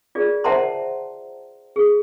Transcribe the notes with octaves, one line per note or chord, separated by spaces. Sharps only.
F4 G#4 D5
C5 E5 F#5 A5 A#5 C6
G#4